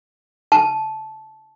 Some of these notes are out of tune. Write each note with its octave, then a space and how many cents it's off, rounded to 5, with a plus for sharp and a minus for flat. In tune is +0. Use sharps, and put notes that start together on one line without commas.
A5 -15